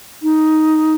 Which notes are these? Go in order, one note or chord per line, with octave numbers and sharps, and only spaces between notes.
D#4